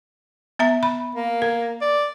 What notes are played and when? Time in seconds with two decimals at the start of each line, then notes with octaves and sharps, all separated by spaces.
0.59 B3 E5 A#5
0.83 B5
1.15 A#3
1.42 A#4
1.81 D5